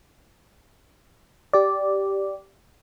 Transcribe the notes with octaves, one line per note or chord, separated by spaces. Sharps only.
G4 D5